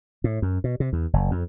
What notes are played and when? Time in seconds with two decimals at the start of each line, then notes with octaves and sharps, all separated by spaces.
0.24 A2
0.42 F#2
0.64 B2
0.80 C3
0.93 E2
1.13 F#1
1.31 F2